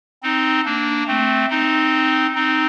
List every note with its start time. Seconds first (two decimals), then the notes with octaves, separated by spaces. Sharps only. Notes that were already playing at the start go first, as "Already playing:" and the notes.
0.23 C4 D#4
0.65 A#3 D4
1.07 A3 C4
1.50 C4 D#4
2.35 C4 D#4